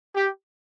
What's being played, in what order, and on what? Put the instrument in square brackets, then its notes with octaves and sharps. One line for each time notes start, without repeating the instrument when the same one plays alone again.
[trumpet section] G4